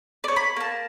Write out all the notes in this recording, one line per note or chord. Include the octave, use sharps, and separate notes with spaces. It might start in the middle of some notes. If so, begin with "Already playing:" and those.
C#5 D5
B5
A#3 A5